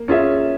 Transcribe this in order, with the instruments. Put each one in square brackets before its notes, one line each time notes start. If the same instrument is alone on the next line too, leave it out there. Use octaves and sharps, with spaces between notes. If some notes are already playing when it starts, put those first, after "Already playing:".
Already playing: [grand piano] A#3
C#4 F4 G#4 E5